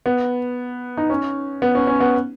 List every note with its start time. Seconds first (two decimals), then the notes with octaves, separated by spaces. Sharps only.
0.06 B3
0.97 D#4
1.10 C#4
1.62 B3
1.75 C#4
1.87 C#4
2.01 B3